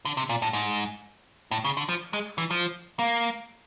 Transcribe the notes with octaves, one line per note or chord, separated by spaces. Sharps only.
D3
C3
A#2
A2
G#2
A2
C#3
D3
F3
G#3
E3
F3
A#3